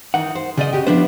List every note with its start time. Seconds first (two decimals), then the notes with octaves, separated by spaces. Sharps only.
0.14 D#3 E3 D#4 F#5
0.35 C5
0.57 C#3 A#3 D5 D#5 F#5
0.73 F#4 G4 G5
0.87 F3 B3 D4 E4 C5